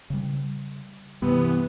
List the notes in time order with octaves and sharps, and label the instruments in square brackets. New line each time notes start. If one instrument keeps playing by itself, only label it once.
[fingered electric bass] C#3 G3
[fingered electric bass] G2 [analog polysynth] C3 E3 [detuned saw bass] B3